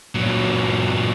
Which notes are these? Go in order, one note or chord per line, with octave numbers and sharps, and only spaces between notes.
A#2 F#3